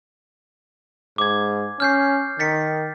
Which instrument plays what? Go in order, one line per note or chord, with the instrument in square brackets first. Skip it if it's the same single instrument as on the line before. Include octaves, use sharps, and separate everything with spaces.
[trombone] G#2 [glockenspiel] D6 G#6
[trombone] C#4 [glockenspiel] F6 G6 C7
[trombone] D#3 [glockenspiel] A6 B6 C#7